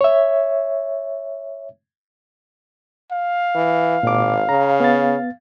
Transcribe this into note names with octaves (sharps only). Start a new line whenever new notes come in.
C#5 E5
F5
E3
G#1 A#2 D6
C#3 A#5
B3 A6